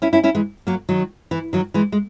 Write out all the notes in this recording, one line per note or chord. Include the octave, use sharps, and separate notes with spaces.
C#4 E4
C#4 E4
C#4 E4
E3 G#3
F#3 A#3
D#3 F#3
E3
D#3 F#3
E3 G#3
G#3